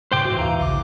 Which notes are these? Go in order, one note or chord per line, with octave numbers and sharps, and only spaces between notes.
G2 A#2 C#3 C5 G5 D6
G#2 E3 F#4
D#2 F5 A#5
A#1 C#3 D6